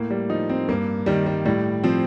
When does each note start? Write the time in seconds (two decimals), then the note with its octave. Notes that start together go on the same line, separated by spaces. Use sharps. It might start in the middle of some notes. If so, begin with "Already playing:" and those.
Already playing: A2 A#3
0.10 G3
0.30 F3 D#4
0.49 C4
0.69 G2 A#3
1.06 D#3 G3
1.26 G3
1.45 A2 G3
1.84 F3 C4